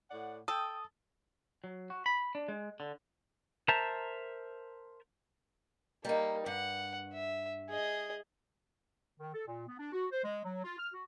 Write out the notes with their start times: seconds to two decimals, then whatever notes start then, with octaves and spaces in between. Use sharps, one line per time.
0.10 A2 D5 F#5
0.48 A4 G5 D#6
1.64 F#3
1.90 F#4
2.06 B5
2.35 D4
2.48 G#3
2.80 D3
3.68 A#4 C5 E5 A5 A#5
6.05 G3 A#3 D#4
6.46 G2 F#5
7.14 E5
7.69 G#4 D#5
9.20 D#3
9.34 A4
9.47 A#2
9.68 B3
9.79 D4
9.93 F#4
10.12 C5
10.24 G#3
10.45 F#3
10.64 F4
10.79 F6
10.94 F#4